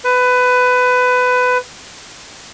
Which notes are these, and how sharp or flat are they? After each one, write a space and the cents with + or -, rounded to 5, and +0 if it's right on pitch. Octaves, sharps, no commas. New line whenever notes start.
B4 +20